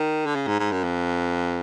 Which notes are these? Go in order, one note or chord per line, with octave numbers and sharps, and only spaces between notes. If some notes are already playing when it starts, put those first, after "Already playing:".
Already playing: D#3
D3
C#3
G#2
G#2
F#2
F2